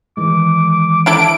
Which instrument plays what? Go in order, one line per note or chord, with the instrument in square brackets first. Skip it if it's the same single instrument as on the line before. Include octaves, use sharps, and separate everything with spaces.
[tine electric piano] D#3 E3 G#3 [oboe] D6
[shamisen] D4 E4 A4 [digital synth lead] D7